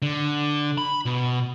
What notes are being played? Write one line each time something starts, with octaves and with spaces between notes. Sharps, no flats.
D3
B5
B2